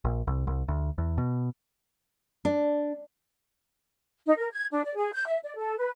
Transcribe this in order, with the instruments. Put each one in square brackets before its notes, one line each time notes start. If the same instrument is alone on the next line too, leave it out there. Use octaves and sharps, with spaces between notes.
[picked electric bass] A#1
C2
C2
D2
E2
B2
[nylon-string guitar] D4
[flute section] D#4
A#4
G#6
D4
D5
G#4
G6
E5
D5
A4
B4